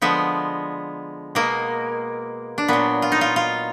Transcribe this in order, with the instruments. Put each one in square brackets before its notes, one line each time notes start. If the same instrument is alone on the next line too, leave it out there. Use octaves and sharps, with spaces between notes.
[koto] D3 F3 G#3 B3
B2 G#3 A#3
D4
A#2 F#3 B3
F4
D#4
F4
F4